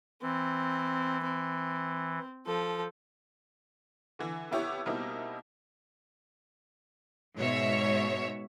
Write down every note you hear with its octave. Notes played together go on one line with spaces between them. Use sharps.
E3 C4
C4
F3 A4
D3 E3
F2 B3 E4 G4 C#5 D6
B2 G3 A#3 C4 D#4 E4
G#2 B2 C#5 E5